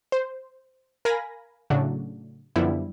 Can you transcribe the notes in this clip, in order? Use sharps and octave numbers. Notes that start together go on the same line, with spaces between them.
C5
A#4 F5 G#5 B5 A#6
A2 C#3 F#3 A3 D4 F#4
F#2 D3 F3 G3 B3 E4